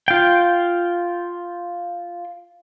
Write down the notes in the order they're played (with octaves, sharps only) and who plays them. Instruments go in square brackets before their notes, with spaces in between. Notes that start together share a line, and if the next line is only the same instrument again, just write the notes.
[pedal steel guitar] F4 G5